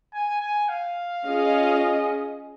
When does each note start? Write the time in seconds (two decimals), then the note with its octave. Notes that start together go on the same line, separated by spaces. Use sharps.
0.13 G#5
0.41 G#5
0.69 F5
1.25 C#4 F4 G#4 D#5